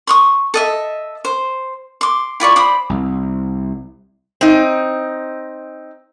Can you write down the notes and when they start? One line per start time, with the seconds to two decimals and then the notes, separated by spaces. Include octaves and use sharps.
0.07 C6 C#6 D#6
0.54 A4 D#5 E5
1.25 C5
2.01 C6 D6
2.40 E4 F4 D5 C#6
2.56 C5 D5 B5 D#6
2.90 C2
4.41 C4 D#4